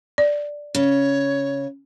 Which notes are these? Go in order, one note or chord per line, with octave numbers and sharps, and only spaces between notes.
D5
C#3 C#5